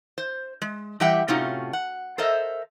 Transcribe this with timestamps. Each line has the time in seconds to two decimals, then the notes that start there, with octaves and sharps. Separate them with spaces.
0.18 C5
0.62 G#3
1.00 E3 G3 G4 E5 F#5 G5
1.28 A2 C3 C#4 D#4 F4 F#4
1.73 F#5
2.18 A4 A#4 C5 D#5 E5